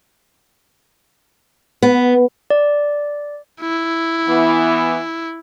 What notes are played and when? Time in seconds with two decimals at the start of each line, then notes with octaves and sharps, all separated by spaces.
1.83 B3
2.50 D5
3.60 E4
4.27 E3 B3